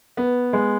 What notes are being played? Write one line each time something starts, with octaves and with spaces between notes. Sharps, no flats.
B3
G#3